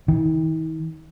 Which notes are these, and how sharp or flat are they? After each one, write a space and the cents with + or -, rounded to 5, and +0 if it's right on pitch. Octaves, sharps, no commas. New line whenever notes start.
D#3 +45